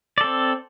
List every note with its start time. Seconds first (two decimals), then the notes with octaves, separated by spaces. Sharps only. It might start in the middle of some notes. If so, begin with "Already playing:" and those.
0.18 D5
0.21 A4
0.24 C4